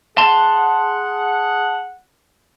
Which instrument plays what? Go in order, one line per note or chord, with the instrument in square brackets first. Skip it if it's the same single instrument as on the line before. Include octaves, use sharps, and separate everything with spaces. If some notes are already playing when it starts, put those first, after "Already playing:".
[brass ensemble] G#4 F#5 [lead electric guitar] A5 C6